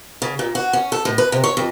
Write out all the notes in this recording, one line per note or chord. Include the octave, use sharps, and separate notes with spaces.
C#3
A#2
F#4
C#4
A4
A2
B4
C3
C#5
F2